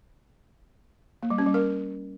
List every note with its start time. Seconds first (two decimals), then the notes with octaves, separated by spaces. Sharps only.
1.23 A#3
1.30 G3
1.38 C#4
1.46 G3
1.54 A#4